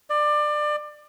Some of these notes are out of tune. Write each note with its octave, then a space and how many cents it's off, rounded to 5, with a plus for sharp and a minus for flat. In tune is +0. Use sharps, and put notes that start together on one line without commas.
D5 +25